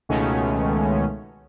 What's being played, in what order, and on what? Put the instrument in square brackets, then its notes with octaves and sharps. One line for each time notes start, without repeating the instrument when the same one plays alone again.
[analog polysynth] C#2 B2 D#3 G#3 A3 C#4